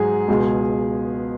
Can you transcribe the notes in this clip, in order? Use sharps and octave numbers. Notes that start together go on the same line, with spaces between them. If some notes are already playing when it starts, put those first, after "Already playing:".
Already playing: G#2 F#3 G#4
C#2 B2 G#3